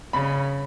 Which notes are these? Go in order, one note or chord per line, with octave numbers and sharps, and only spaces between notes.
C#3 B5